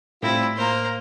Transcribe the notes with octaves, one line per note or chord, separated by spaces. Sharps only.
A2 G3 C4 E4 F4
A#3 C5 A#5